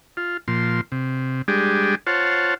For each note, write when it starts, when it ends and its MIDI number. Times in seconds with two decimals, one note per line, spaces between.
0.17 0.37 65
0.48 0.81 46
0.48 0.81 53
0.48 0.81 84
0.92 1.42 48
1.48 1.95 55
1.48 1.95 56
1.48 1.95 62
1.48 1.95 67
1.48 1.95 68
2.07 2.54 65
2.07 2.54 72
2.07 2.54 73
2.07 2.54 78
2.07 2.54 81